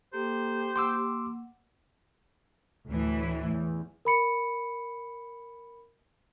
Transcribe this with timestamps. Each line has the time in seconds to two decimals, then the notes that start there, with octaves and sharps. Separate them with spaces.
0.13 A#3 G4 A4 C5 A#5
0.76 A#3 F#5 C6 D6 E6
2.87 D2 A2 E3
3.49 E2
4.05 A#4 B5 C#7